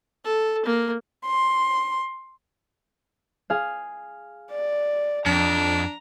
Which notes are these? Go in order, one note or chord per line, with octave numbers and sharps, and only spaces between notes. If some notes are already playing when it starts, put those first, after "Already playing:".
A4
A#3
C6
G#4 F5
D5
F2 D4 A#5